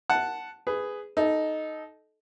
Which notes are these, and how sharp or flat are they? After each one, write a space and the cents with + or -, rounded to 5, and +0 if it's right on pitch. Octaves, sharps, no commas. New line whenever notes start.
F#5 +0 A5 +0
G#4 +0 B4 +15
D#4 +0 A4 -20